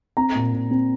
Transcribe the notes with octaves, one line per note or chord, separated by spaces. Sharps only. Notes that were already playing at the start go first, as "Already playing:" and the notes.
C4 A#5
A#2
A#2
C4